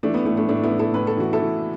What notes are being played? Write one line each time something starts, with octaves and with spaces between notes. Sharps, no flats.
E3 A3 D4
B3
A2 A3
A3 D4
A2 A3 D4
B3 E4
A2
E4 A4
A2 B4
A4
E3 F#4
E4 A4
E3